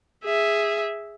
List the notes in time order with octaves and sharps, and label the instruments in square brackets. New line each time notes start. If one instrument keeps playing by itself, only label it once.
[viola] G#4 E5